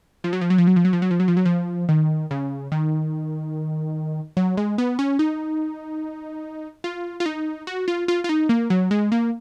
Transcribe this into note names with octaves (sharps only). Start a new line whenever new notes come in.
F3
F#3
F3
F#3
F3
F#3
F3
F#3
F3
F#3
F3
F#3
F3
F#3
F3
D#3
C#3
D#3
F#3
G#3
B3
C#4
D#4
F4
F4
D#4
F#4
F4
F4
F4
D#4
A#3
F#3
G#3
A#3